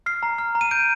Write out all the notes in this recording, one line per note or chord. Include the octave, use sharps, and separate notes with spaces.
F6 C7
A#5
F6
A#5
D#7
G6 D7